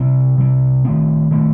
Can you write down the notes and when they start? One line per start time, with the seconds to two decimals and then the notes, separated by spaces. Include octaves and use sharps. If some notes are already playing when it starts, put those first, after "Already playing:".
Already playing: C3 G3 C4
0.38 C3 G3 C4
0.85 D#3 A3 C4
1.31 D#3 A3 C4